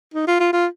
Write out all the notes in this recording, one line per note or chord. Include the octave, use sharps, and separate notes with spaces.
D#4
F4
F4
F4